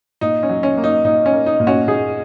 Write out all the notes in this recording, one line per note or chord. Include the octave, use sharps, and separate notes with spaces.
A#2 D#4
C#4
F#3
C#4
A#3
D#4
A#2 D#4
C#4
A#3
D#4
A#2
C#4 F#4
A#2 D#4 G#4